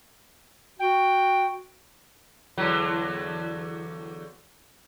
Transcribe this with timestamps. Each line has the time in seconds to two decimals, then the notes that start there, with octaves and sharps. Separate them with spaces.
0.80 F#4 G5
2.58 E2 D3 F#3